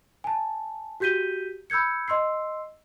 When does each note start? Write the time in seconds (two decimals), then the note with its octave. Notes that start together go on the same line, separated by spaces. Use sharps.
0.24 G#5 A5
1.00 F#4 G4 G6 B6 D#7 G7
1.70 B5 E6 G6 G#6 C#7
2.08 D#5 C6 E6 C7